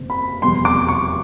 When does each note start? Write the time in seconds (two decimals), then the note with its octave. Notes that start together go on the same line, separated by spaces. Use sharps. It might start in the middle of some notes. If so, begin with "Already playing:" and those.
Already playing: F#1 E2 C3
0.10 B5
0.42 F1 E2 B2 G3 C6
0.65 D6
0.88 C#6